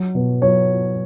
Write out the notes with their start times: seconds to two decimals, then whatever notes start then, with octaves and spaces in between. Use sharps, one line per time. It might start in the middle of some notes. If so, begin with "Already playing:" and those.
Already playing: F#3
0.15 B2
0.42 F#3 C#5